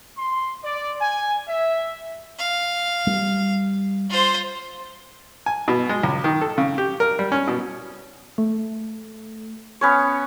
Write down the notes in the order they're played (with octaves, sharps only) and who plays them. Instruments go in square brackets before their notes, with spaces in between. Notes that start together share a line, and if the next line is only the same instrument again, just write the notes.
[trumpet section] C6
D5
G#5
E5
[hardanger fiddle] F5
[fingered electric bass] G3
[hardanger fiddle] F4 C5
[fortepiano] G#5
B2
G#3
C#2
D#3
A4
C#3
G4
A#4
G3
C#4
B2
[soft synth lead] A3
[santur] B3 C#4 C#5